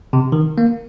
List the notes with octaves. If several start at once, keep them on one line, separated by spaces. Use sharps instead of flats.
C3
D#3
A#3